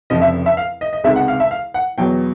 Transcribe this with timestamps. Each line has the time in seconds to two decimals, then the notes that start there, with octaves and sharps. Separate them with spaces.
0.10 F1 F2 C#3 F3 D#5
0.21 E5
0.46 E5
0.57 F5
0.81 D#5
0.93 D#5
1.04 C#2 C3 D#3 G#3 E5
1.16 F#5
1.28 F5
1.40 E5
1.51 F5
1.74 F#5
1.98 E2 B2 F#3 G5